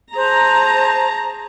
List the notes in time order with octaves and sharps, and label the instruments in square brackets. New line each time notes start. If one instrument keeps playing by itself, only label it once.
[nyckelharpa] G#4 A5 [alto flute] C5 [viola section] A#5